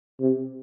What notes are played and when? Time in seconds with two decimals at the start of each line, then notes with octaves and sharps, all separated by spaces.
0.20 C3